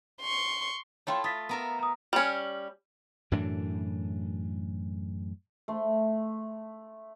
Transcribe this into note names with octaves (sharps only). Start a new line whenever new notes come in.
C6 C#6
A3 E4 F4 C#5 G5 C6
F4 D#6 A6 B6
B3 A#4 E5
A#5 D#6
G3 C#4
F#2 A2 E3 D4
A3 C6